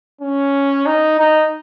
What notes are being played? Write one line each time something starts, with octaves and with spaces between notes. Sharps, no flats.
C#4
D#4
D#4